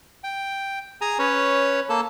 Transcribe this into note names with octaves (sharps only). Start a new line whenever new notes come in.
G5
G#4 G#5 A#5
C#4 B4 C#5
A#3 A4 A5